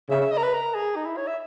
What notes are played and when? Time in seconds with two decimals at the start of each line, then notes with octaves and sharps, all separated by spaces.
0.10 C#3 E5
0.21 E5
0.31 D#5
0.37 A#4
0.43 B4
0.54 A#4
0.75 G#4
0.96 D#4
1.06 E4
1.17 C#5
1.27 E5